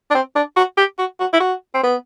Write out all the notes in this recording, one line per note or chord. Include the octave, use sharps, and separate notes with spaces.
D4
C4
D4
F#4
G4
F#4
F#4
E4
F#4
C4
B3